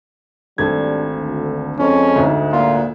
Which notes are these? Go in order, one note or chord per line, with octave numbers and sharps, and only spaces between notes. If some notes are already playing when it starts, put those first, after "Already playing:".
G#1 G3 A3 D4 G#6
D2
F2 G#3 C#4 D#5
D2 G#2
A#2 F4